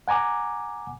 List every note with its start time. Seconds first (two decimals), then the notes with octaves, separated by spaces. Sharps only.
0.08 F#5 G#5 A#5 D6